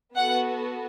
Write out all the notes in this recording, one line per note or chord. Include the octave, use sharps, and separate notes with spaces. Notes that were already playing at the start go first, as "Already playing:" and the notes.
B3 F#4 A4 F#5